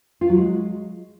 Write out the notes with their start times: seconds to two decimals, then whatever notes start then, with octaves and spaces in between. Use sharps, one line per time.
0.21 F4
0.29 F#3
0.38 G#3